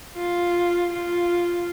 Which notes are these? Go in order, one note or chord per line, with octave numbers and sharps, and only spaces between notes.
F4
F4